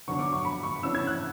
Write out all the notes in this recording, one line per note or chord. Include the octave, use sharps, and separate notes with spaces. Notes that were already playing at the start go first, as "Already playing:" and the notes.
D3 F#3 B3 D4 C#6
D6
C#6
B5
C#6
C#3 E3 B3 D4 E6
G#6
F#6